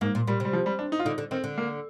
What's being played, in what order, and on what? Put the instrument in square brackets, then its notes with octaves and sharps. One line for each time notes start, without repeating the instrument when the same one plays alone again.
[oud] G#2 [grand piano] A#3
[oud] A#2
[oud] A#2 [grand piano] G3
[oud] C3 [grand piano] G3
[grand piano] F3
G3
D4
D#4
F4
[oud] D3 [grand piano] D#4
[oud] D3
[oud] D#3 [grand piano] C4
[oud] D3
[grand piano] A#3